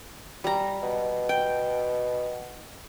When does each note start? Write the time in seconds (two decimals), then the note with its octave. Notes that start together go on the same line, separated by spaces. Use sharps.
0.44 G3 A#5
0.83 B2
1.29 G5